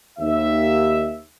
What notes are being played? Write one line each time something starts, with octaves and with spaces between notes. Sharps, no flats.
D#2 E5